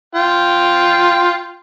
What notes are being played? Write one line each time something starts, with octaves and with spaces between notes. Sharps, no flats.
F4 G5